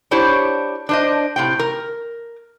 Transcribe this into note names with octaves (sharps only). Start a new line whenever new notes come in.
D4 E4 G4 C5 C#5
D4 C5 D#5
A2 C3 G5
A#4